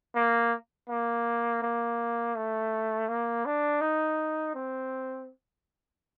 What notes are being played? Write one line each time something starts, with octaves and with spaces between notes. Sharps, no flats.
A#3
A#3
A#3
A3
A#3
D4
D#4
C4